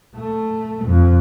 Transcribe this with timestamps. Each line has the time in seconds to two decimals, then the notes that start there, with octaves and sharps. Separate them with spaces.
0.15 A3
0.86 F2